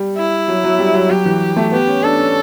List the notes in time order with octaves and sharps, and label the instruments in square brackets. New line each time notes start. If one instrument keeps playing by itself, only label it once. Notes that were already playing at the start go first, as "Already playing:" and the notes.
Already playing: [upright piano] G3
[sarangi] E4
[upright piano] F#3
F#3
G3
F#3
[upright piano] F#3 [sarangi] G4
[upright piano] E3
A3
[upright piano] B3 [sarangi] G4
[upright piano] C#4
[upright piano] D4 [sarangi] A4
[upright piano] C#4